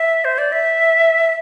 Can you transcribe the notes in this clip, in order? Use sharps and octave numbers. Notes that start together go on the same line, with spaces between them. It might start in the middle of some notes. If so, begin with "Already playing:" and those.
Already playing: E5
C5
D5
E5